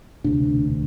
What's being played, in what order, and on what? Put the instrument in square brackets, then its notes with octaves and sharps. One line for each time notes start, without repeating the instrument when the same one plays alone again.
[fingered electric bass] E1 D2 C3 D4